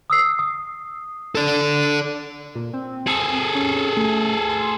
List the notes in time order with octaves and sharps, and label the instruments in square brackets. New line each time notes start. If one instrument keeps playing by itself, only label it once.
[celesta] D#6 E6 C7
D#6
[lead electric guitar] A4 D5
[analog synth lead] A#2
C4
[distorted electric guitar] G#4 A4
[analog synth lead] C#4
A3
C6